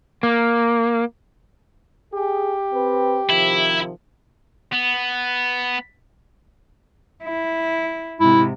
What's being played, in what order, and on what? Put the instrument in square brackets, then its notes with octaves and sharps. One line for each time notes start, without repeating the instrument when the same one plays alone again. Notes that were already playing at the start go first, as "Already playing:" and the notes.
[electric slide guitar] A#3
[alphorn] G4 [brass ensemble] G#4
[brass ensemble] C4 B4
[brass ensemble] C3 D#3 F3 [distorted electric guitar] E4
[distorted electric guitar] B3
[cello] E4
[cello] G#2 C3 [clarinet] E4